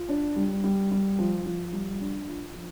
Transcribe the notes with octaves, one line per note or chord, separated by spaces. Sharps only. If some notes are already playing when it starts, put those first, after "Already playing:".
Already playing: F4
D4
G3
G3
G3
F3
F3
G3
D4
F4
F3